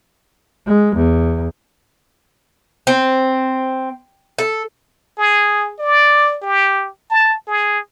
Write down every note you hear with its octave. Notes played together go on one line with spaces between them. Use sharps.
G#3
E2
C4
A4
G#4
D5
G4
A5
G#4